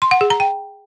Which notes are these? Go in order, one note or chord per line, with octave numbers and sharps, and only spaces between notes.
C6
F#5
G#4
A#5
G5